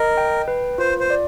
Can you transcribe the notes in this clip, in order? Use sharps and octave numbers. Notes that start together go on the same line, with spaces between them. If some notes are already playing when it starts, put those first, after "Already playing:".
Already playing: A#4 D#5
G5
B4
F4 C5
C5
D5